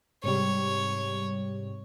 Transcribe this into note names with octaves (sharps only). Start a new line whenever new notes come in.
G#2 C3 G3 C#5